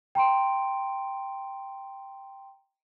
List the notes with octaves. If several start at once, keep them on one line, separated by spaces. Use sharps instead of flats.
G5 A#5 C6 D7